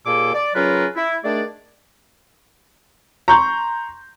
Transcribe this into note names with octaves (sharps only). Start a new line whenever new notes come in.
D#2 A#2 A#3 G#4 A4 D6
D5
C#3 F#3 C#4 F4 A#4 B4
E4
D#3 A3 D4 G#4 D5
A#5 C6 C#6 G6